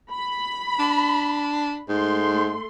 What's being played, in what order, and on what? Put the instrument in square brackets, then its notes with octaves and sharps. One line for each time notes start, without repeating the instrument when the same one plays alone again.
[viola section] B5
[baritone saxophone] D4
[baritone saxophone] G#2 [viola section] A3 C6